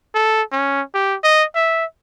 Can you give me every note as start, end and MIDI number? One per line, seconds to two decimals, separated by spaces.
0.15 0.42 69
0.52 0.82 61
0.94 1.16 67
1.24 1.44 75
1.55 1.85 76